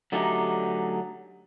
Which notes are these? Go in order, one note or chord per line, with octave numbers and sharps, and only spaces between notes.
D3 F#3 A3 C#4 D#4 G4